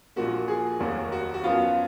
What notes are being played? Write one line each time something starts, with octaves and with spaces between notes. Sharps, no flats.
A#1 A#2 F3 A#3 F#4
G#4
F1 D#2 D#3 F#3 A#3 F#4
F#4
F#4
F#2 F3 B3 F4